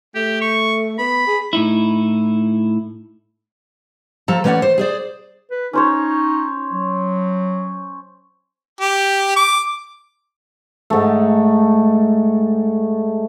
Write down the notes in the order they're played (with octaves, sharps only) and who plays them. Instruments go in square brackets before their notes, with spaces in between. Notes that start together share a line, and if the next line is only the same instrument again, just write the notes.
[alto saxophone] A3 [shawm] G4
[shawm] C#6
[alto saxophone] B3 [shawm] B5
[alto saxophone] G#4
[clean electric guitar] A2 D#4 E4
[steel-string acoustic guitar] F3 A4 A#5
E3 A3 C#4 C#5 D5 F#5
C5
G#4 C5 D5
[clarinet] B4
[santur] C#4 C5 C#5 [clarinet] D#4
[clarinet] F#3
[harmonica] G4
D6
[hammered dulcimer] G#2 A3